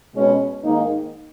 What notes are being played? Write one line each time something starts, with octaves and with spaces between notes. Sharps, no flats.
B2 G#3 C#4
G#2 D#3 A#3 D#4